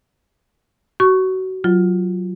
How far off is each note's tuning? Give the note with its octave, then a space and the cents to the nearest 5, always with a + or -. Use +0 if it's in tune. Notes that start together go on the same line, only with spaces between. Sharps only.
F#4 +25 C#6 +0
F#3 +0 F4 +0